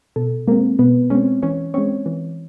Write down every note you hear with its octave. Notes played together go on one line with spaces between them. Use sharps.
B2 A4
G#3 A#3 C4 A#4
B2 B3 B4
G#3 C4 C#4 C#5
E3 C#4 C#5
G#3 C4 C#4 C#5
E3